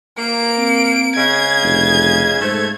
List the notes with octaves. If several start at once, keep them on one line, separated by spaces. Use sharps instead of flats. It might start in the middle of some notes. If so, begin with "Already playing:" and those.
A#3 D7
C4
C#3 G#3 G#4 G#6
F1
G#2 A3 A4 C5